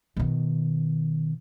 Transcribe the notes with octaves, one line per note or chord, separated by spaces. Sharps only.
B2 D#3